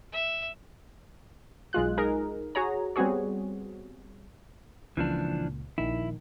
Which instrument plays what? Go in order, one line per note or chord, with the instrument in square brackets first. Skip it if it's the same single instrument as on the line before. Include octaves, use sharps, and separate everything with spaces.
[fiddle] E5
[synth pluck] B1 G#3 F4 F#6
D#4 G#4 A#4
F#4 G#4 C#5 A#5
G3 B3 C4 F#4 G#4 C#5
[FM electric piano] C#2 A#2 [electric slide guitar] E3 F3 D4
[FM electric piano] A#1 D#3 [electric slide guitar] E4